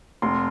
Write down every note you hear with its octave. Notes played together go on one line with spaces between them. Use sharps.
F1 C6